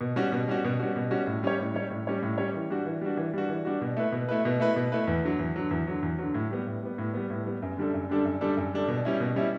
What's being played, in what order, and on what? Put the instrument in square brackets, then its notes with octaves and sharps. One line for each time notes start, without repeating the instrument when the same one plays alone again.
[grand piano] B2
G3 C#4 F#4
B2
G3 C#4 F#4
B2
G3 C#4 F#4
B2
G3 C#4 F#4
A2
G3 C#4 G4 C#5
A2
G3 C#4 G4 C#5
A2
G3 C#4 G4 C#5
A2
G3 C#4 G4 C#5
E3
G3 D4 F#4
E3
G3 D4 F#4
E3
G3 D4 F#4
E3
G3 D4 F#4
B2
A3 E4 B4
B2
A3 E4 B4
B2
A3 E4 B4
B2
A3 E4 B4
E2
D3 F#3
E2
D3 F#3
E2
D3 F#3
E2
D3 F#3
A2
G3 B3
A2
G3 B3
A2
G3 B3
A2
G3 B3
F#2
D3 G3 D4 A4
F#2
D3 G3 D4 A4
F#2
D3 G3 D4 A4
F#2
D3 G3 D4 A4
B2
G3 C#4 E4
B2
G3 C#4 E4